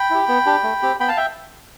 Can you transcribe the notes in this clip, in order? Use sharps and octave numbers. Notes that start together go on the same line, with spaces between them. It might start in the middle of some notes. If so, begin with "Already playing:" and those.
Already playing: G5 B5
E4 G4
B3
D4 G4
A3
C4 G4
B3 G5 B5
F5 A5
E5 G5